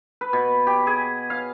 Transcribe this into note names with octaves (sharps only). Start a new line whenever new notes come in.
B4
B2
G4
G#4
F5